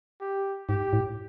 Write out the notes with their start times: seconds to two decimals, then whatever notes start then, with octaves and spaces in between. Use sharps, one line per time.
0.20 G4
0.69 G#2 G4
0.93 A2